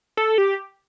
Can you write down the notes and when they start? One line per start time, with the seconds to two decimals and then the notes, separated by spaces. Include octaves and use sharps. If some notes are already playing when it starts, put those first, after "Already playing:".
0.17 A4
0.38 G4